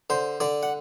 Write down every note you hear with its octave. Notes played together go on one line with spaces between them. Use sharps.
D3 C5
D3 D5
F#5